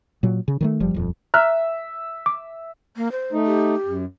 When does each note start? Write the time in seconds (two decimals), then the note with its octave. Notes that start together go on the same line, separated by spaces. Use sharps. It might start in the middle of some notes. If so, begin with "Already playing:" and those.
0.23 A#2 F#3
0.48 C#3
0.61 D#3 F3 A3
0.80 F#1 F3 G3
0.94 D#1 F2
1.34 E5 A#5 F6 F#6
2.26 D6
2.97 A#3
3.12 C5
3.33 A3 D#4
3.46 G4
3.86 F#2